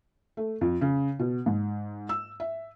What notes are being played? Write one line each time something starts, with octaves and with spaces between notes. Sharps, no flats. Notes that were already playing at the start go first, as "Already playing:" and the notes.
A3
F2
C#3
B2
G#2
E6
E5